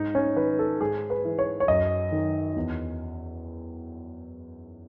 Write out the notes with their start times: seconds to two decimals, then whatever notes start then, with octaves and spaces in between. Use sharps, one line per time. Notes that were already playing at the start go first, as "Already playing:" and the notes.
Already playing: G#2 D#4
0.15 C#4
0.36 D#3 B4
0.59 A4
0.80 G#2 G#4
1.10 B4
1.25 E3
1.39 C#5
1.60 C#5
1.68 F#2 D#5
2.12 D#3
2.56 E2